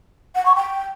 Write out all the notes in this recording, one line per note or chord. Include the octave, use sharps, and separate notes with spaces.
F#5
C#6
G5